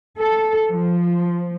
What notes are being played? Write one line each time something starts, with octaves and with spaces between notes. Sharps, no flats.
A4
F3